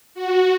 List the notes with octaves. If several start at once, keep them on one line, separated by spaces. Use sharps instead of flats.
F#4